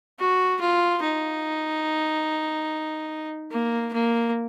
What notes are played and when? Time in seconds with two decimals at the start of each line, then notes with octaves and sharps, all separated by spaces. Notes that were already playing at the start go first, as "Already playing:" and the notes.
0.18 F#4
0.60 F4
1.02 D#4
3.51 A#3
3.93 A#3